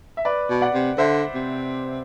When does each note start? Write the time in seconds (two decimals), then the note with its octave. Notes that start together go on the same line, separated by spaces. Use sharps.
0.17 E5
0.25 B4 D5
0.50 B2
0.61 D5 F#5
0.74 C3
0.98 D3 C5 E5
1.34 C3